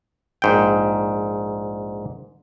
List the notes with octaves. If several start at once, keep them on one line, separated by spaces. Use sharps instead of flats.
A#1 G#2 G5